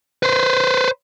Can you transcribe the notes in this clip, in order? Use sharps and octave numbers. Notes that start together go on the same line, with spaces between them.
B4 C5